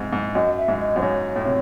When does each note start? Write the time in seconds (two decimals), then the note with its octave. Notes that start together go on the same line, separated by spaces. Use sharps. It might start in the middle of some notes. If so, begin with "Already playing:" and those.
Already playing: G#2 C3
0.13 G#2
0.35 F#2 D#5
0.58 E5
0.68 G#2
0.80 D#5
0.96 F#2 C5
1.02 G#2 C#5
1.36 A2
1.46 C3